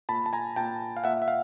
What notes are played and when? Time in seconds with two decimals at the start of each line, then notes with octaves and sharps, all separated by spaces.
0.09 A#2 A5 B5
0.26 A5
0.33 G#5 A#5
0.56 A#2 G5 A5
0.97 F5
1.04 A#2 E5 F#5
1.22 E5
1.28 F5